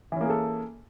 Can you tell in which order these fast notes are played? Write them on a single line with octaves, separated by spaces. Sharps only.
E3 C#4 A#3 G#4 A4